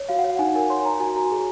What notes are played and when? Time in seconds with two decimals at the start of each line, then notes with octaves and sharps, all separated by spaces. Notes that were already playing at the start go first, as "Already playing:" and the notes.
Already playing: C#5
0.09 F#4 F5
0.19 F#5
0.24 C#5
0.30 F#5
0.39 D#4 G#5
0.55 A#4 G#5
0.70 C#5 C6
0.85 C#5 A#5
1.00 F#4 G#5
1.16 F#4 A#5
1.31 G#4